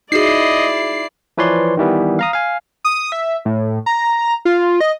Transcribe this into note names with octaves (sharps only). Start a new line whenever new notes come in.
D#4 E4 F#4 G#4 D5 D#5 C7
E3 F3 B4 C#5 D5 C6
D#3 E3 G3 B3
F5 A#5 D#6
F5 G#5
D#6
E5
A2
A#5
F4
D#5